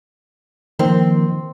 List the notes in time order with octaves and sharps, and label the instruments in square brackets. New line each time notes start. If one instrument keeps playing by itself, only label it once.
[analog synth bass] D#3 [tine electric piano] F3 A#3 [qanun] C4